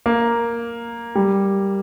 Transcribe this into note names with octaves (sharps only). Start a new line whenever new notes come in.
A#3
G3